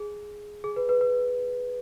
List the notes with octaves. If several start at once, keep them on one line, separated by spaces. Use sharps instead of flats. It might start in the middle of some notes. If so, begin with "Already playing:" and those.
Already playing: G#4
G#4
B4
B4
B4